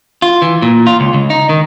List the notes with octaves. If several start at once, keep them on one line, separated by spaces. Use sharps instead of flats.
F4
E3
A#2
F4
C#2
C#2
D#4
D#3